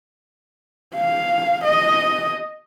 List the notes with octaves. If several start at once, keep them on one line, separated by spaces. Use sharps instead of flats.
F5
D#5